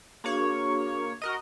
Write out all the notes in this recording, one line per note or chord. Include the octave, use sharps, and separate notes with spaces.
A#3 D4 F#4 G#4 C#5
F#4 A#4 D#5